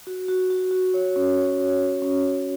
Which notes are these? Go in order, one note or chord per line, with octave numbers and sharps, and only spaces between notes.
F#4
F#4
F#4
F#4
C#5
C#4
C#5
C#4
C#4
C#4
C#4